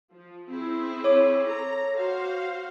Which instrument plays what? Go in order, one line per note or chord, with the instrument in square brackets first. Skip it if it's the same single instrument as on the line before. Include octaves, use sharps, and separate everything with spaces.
[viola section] F3
C4 E4 G#4
[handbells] C#5 D6
[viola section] A4 A#5
F#4 C5 F5